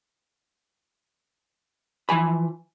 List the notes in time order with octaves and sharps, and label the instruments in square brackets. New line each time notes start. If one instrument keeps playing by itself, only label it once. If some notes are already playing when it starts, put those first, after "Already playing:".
[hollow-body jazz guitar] E3 F3 G#5 B5